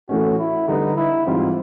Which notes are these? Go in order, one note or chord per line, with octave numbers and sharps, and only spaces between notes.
A2 E3 A3 C#4 F#4
E4
D3 G3 B3 D#4
E4
G#2 E3 G3 C4 D#4 F4